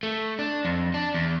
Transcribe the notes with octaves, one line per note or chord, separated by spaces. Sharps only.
A3
D4
F2
D4
E2